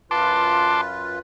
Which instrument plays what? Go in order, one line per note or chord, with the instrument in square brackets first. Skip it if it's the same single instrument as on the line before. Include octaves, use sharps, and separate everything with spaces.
[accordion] F#2 F4 B4 [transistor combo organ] A5 C6 D6